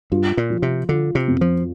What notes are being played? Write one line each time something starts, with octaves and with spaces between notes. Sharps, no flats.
G2 F4
A#2
F3
C3
D3 F4
C3
F2
F3